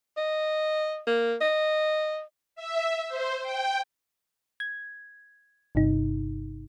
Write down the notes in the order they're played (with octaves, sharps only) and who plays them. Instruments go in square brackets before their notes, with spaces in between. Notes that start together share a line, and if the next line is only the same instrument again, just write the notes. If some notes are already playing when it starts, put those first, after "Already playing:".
[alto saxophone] D#5
A#3
D#5
[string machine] E5
C5
G5
[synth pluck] G#6
G1 G2 C3 D#4